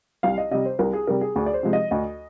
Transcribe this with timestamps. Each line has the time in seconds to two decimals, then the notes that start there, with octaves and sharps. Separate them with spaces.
0.23 C2 F5
0.38 D#5
0.51 C3 G3 D#5
0.65 C5
0.79 C2 A#4
0.93 G#4
1.07 C3 G3 A#4
1.21 G#4
1.36 D2 G#4
1.46 D5
1.54 C5
1.63 C3 F3 G#3
1.73 D#5
1.91 D2 D#5